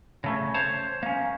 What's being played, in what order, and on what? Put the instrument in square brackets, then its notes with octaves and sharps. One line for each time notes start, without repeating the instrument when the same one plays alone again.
[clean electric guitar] C#3 A3 C#4
C5 C#5 A5
A#3 C#4